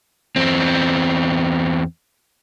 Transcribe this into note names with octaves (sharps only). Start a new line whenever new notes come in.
E2 C4